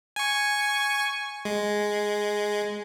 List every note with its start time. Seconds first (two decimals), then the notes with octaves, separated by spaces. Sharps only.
0.16 G#5 C#6
1.45 G#3